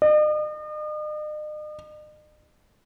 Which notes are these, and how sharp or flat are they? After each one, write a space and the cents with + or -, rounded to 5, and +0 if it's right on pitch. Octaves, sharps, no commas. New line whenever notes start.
D#5 -45